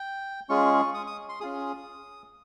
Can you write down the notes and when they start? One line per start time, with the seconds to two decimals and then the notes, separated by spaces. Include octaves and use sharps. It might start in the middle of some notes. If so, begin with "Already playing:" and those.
Already playing: G5
0.49 G#3 C#4 F4 G#4 C#6
0.94 D#6
1.07 D#6
1.29 C6
1.40 C#4 F4 G#4 D#6